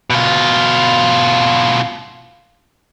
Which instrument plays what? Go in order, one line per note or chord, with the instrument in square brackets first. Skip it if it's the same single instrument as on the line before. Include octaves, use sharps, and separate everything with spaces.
[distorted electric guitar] B2 F4